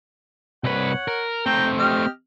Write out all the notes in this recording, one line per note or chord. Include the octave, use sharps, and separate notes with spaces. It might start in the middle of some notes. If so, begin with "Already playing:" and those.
C2 B4 C#5 F#5
A#4
A3 C4 G5 A#5
G4 D#5 F6